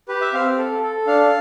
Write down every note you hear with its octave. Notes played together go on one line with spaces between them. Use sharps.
G4 B4
E5
C4 F5
A4
A4
D4 F5